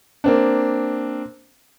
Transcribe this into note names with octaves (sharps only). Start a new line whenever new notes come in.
A#3 C4 D4